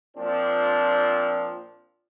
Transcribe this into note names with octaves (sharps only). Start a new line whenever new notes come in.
A#2 F3 C4 D4